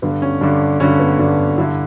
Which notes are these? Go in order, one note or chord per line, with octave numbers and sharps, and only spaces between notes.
G2 D3 B3
C#4
G2 D3 D4
G2 D3 C#4
B3
G2 D3 D4
G2 D3 E4